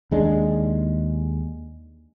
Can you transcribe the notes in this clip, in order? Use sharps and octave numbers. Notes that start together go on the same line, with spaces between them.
D#2 G#3 D4